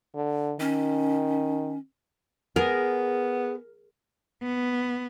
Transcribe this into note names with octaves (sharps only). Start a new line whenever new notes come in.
D3
D#3 C#4
B3 G#4 A#4
B3